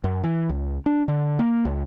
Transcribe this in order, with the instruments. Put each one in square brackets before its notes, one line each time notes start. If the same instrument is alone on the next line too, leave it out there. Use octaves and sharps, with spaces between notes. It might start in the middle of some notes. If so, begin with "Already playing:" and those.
[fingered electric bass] F#2
E3
C#2
D4
D3
A#3
C#2